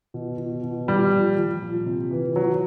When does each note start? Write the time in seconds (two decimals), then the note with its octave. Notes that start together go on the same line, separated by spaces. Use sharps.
0.14 B2
0.38 B2
0.63 B2
0.88 A#2 G3
1.12 F3
1.37 F3
1.62 A#2
1.86 C3
2.11 E3
2.36 E3 F#3